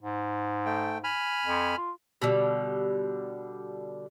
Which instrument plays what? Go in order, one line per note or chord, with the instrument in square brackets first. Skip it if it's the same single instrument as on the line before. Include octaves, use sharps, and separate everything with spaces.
[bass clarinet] G#2
[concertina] A3 G5
G#5 B5 F6
[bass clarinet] F2
F4
[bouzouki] B2 D3 G3